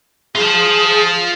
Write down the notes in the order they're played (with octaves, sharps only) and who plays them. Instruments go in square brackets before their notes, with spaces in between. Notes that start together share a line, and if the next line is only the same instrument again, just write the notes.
[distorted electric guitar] F4 A5 [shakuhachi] G#4